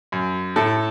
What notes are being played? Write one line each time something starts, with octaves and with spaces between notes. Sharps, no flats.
F#2
A2 A4